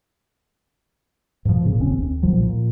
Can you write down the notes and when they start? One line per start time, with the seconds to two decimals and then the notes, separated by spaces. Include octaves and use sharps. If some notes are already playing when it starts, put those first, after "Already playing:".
1.45 G#2 B2 D3 F3
1.63 A#2 C#3
1.78 F1 D#2 C4 C#4
1.98 D#2
2.23 B1 A#2 F3 F#3
2.42 A#2